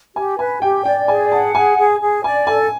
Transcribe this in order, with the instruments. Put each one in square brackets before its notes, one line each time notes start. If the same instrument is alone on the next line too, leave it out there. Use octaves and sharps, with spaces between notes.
[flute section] G4 [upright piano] G#5
[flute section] B4 [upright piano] G#5
[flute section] G4 [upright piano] G5
[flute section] D5 [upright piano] G5
[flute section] G#4 [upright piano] G#5
[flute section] F#5 [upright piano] A5
[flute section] G#4 [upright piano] G#5
[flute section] G#4
G#4
[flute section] D5 [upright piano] G#5
[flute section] A4 [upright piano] G#5